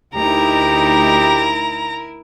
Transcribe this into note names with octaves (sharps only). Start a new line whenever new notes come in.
D2 D#4 E4 G4 A#4 A#5